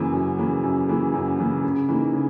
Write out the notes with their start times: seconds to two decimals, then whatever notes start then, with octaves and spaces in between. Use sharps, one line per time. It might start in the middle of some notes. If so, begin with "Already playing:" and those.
Already playing: F#2 C#3 E3 A#3
0.13 F#2
0.38 C#3 E3 A#3
0.63 F#2
0.88 C#3 E3 A#3
1.14 F#2
1.38 C#3 E3 A#3
1.63 C#3
1.88 E3 A#3 D#4
2.13 C#3